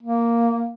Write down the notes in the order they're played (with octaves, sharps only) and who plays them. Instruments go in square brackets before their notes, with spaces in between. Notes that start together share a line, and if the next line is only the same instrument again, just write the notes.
[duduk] A#3